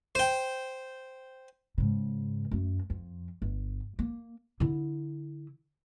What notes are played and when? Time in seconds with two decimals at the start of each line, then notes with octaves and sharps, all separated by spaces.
0.15 C5 G5
1.78 G#2 C#3
2.51 F#2 A3
2.90 F2
3.42 G1
3.99 A#3
4.60 D3 E4